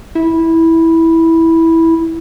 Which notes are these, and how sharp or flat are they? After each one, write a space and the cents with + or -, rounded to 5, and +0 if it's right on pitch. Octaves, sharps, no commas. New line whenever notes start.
E4 -10